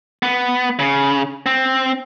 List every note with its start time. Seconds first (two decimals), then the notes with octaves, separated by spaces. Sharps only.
0.23 B3
0.80 C#3
1.46 C4